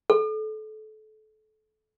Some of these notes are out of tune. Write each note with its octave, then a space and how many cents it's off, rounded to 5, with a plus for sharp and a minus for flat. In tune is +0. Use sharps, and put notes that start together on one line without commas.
A4 -25